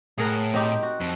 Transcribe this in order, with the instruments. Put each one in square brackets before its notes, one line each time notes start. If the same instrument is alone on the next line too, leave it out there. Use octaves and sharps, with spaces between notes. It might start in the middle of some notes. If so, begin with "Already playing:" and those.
[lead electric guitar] A2 [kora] G#4 A#4 F#5
[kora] C4 D#4 G4
F#4
[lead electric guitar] F2